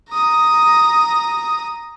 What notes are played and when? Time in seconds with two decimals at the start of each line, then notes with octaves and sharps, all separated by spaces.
0.10 A#5 D#6